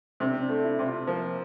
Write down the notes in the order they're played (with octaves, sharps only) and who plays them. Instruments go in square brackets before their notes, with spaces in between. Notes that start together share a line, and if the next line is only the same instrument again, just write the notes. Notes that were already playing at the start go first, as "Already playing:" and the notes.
[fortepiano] C3 [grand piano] D4
[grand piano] C4
D4
[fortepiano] A3
[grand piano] D4
E4
[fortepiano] C3
[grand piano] F4
[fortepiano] F3 [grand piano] A#3